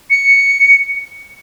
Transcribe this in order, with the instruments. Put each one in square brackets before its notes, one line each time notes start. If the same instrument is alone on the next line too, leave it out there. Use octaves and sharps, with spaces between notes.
[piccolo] C#7